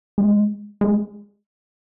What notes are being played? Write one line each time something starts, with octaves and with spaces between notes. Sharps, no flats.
G#3
G#3